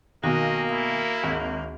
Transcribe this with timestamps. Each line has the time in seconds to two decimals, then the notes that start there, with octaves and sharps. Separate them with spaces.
0.24 B1 D#3 A#3 F#4 A#4 D#5
0.69 E4 D#6
1.24 G#1 D2 G#4